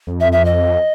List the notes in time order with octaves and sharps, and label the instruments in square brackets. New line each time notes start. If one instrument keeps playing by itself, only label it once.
[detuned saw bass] F2
[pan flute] E5
E5
D#5